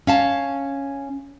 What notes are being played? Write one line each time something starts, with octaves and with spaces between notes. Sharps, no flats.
C#4 F5 A5